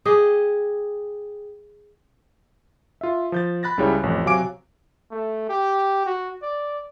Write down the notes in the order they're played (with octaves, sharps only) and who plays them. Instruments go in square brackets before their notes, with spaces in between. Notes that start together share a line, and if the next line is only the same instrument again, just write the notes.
[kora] G4 G#4 D#5
[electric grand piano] F4 E5
F3 G6 A6
B5 F#6 A6 A#6
C#2 C#3 G3 E4 C#5
A1 F2
C3 F#3 F5 G#5 D6 D7
[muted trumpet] A3
G4
F#4
D5